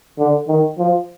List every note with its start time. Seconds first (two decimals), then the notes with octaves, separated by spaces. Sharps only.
0.19 D3
0.48 D#3
0.78 F3